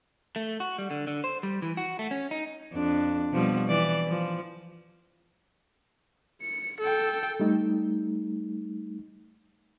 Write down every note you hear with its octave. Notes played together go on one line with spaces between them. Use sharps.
A3
F#4
G3
D3
D3
C5
G3
E3
F#4
A3
C#4
D#4
F2 D4
B2 F3 G3
E3 D5
F3
C#7
A4 G5
G3 A3 D#4